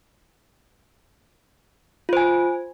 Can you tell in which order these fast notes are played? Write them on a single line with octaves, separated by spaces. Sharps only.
F4 C5 G#5